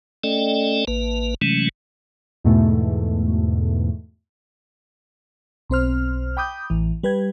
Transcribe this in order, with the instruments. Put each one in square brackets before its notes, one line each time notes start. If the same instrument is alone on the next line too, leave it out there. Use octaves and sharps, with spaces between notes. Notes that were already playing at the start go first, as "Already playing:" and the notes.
[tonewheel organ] A3 C#4 A4 D5 D#5 G5
A1 A#3 B4
C3 E3 F#3 G#3 A3 C#4
[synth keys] E2 G#2 B2 A3
[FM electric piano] B1 C4 C5 F6
G5 B5 D6 D#6 G6
A1 E3
G3 B4 G5 G#6